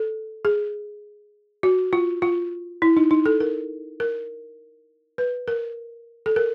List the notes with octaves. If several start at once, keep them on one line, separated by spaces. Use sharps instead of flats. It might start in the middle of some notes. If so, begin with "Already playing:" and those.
Already playing: A4
G#4
F#4
F4
F4
E4
D#4
D#4
A4
A#4
A#4
B4
A#4
A4
A#4